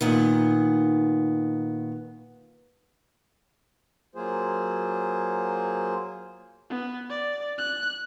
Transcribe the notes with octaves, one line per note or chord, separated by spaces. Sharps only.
A#2 D#3 B3
F#3 A#3 F4 G#4 C5
B3
D5
F#6